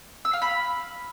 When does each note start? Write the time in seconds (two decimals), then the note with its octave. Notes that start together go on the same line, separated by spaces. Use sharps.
0.25 E6
0.33 F5
0.42 B5